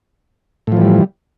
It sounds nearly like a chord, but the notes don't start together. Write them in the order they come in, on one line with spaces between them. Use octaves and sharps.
A2 F3 E3 G3